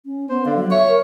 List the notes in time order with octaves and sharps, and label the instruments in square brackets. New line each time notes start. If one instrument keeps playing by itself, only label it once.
[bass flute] C#4
[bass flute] B3 [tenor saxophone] C5
[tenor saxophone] D3 [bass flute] F5
[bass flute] F#3
[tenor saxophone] C#5 [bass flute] E5
[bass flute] A#4